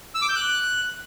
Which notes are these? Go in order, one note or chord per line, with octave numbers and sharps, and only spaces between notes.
E6
D6
G6
F#6